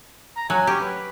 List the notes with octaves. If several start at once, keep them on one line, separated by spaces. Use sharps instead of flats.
A#5
F#3 G#5
C#4 G4
B4